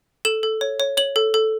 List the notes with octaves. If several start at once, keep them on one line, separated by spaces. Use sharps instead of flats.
A4 E7
A4
C#5
C#5
C#5 F#7
A4
A4